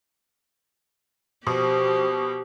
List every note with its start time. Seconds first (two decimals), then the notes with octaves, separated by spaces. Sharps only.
1.47 B2 F3 G4